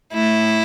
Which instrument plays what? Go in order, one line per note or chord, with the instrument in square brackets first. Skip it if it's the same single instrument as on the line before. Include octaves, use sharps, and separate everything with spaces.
[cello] A3 [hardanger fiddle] E4